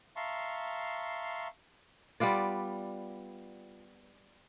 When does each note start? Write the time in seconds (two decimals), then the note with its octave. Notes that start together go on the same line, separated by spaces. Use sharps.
0.16 E5 F5 A5 A#5 C6 C#6
2.20 G3 B3 F4 D5